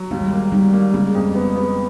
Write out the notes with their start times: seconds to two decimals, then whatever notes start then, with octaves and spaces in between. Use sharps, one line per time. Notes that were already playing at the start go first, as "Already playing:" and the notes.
Already playing: F#3
0.11 D#2 G#3
0.21 G3
0.32 G#3 A#3
0.52 D#3 G3
0.73 A#3
0.93 C#3 G#3
1.15 F2
1.35 B3
1.56 B3